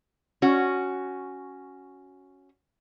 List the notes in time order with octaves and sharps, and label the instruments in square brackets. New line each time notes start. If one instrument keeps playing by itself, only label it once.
[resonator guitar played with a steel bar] C#4 F#4